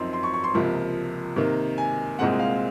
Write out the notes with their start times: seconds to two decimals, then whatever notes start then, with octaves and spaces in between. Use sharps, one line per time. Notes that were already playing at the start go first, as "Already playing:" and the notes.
Already playing: F#2 F3 C4 D#4 C6
0.13 C6
0.23 C#6
0.34 C#6
0.44 C6
0.54 C#2 C3 F3 A#3
1.36 C3 D#3 A#3
1.78 G#5
2.19 C2 A#2 G#3 C4 F#5
2.39 F5